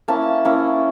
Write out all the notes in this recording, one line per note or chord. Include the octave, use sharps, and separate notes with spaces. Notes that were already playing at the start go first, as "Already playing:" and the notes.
A#3 C#4 E4 A5
A#3 C#4 E4